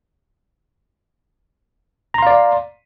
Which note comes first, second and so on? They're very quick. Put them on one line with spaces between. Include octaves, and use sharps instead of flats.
A#5 C6 F5 D5